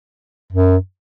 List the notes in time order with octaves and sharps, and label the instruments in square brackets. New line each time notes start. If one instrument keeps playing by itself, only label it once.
[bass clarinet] F#2